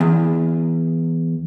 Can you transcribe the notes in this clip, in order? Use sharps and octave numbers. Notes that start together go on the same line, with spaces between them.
E2